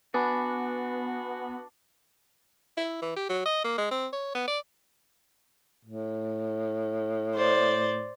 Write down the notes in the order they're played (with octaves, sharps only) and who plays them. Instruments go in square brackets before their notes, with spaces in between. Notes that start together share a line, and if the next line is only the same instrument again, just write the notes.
[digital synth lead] B3 [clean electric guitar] D4 [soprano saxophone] F#4 [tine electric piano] B4 G#5 B5
[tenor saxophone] E4
E3
G4
F#3
D#5
A#3
G#3
C4
C#5
B3
D5
A2
[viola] C5 D5